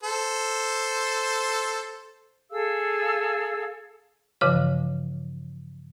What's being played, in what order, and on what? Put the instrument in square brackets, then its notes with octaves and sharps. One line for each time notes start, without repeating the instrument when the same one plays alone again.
[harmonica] A4 C5
[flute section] G#4 A4 F5 E6
[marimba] G2 C#3 E3 F3 C#5 F5